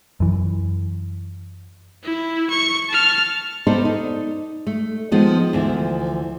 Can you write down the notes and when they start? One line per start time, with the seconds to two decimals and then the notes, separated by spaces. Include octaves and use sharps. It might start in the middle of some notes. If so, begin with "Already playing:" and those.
0.20 F#2 E3
2.03 E4
2.50 C#6
2.89 A5 F6
3.67 B3 D4 D#4 A4 B4 C5
3.85 D#4
4.67 A3
5.12 D#3 F3 G#3 B3
5.53 D2 E3 F3